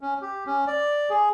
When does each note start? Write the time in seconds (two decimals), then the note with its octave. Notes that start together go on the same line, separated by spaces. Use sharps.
0.01 C#4
0.22 G4
0.47 C#4
0.67 D5
1.10 G#4